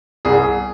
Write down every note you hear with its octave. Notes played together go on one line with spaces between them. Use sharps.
C2 G#4